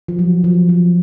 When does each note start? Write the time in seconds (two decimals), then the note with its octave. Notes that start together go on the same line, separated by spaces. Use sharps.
0.08 F3
0.19 F#3
0.44 F3
0.69 F3